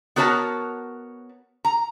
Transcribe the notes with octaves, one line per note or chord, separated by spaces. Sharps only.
B3 F#4 A#4 C#5 D#5 A5
A#5